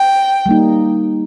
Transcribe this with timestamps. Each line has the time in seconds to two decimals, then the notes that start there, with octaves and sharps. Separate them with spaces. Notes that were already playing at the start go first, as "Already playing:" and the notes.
Already playing: G5
0.46 G3 A#3 D#4